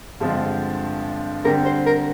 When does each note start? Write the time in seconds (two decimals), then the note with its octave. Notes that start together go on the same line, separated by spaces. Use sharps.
0.20 G2 D3 F3 G#3 C4
1.44 D3 G3 C4 G4 A#4
1.65 C5
1.86 A#4